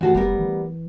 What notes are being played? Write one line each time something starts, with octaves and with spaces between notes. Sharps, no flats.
D2 E3 F#4 A4
F1 G3 B3 A#4
E3